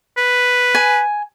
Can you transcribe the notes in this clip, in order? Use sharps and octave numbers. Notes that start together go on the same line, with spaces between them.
B4
G#5